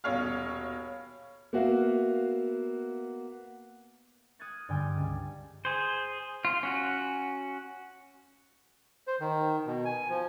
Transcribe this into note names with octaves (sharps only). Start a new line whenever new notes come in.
D#1 B2 C#5 F5 F6
A#3 B3 F#4 E5 F5
D#6 F6 F#6 G#6 A6 C#7
G2 D3 G3 G5 G#5
C#2
G#4 C5
F4
C#4 F#4
C5
D#3
B2
G#5
F3